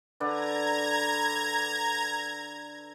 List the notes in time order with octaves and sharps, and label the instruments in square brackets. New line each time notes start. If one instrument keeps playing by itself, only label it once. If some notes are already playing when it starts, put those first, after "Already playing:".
[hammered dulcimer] D3 B4 D5 [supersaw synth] A#5 G#6